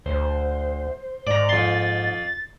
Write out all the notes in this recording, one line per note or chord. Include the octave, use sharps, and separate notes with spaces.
D2 C5
G#2 D5 A#5
F2 C6 A6